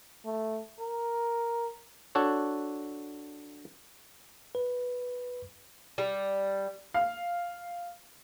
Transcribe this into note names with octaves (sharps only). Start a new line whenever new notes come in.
A3
A#4
D4 F#4 A4 C#5
B4
G3
F5